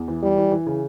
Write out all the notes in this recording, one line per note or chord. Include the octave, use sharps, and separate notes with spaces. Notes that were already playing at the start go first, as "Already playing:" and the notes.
Already playing: E2
E3
E3 G3
E3
E3
C#3